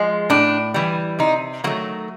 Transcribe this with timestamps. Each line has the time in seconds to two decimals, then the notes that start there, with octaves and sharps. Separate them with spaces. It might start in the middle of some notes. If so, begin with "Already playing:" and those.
Already playing: F3 G#3
0.30 A2 D4
0.74 E3 G3
1.19 C3 D#4
1.64 D#3 F#3 A3 A#3